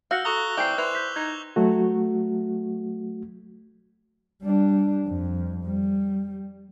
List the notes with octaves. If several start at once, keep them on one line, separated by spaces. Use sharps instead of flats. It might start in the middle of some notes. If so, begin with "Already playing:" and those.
F#4 F5 E6 G6 A#6 C#7
F#4 A4 A#5 C#6 D#6 F#6 G7
E3 C4 D5 G5 G#5 D6 C7
E4 B4 C5 F#6 F7
G6 B6
D#4 G#6
F#3 A3 F#4
G3 D4
F2
G3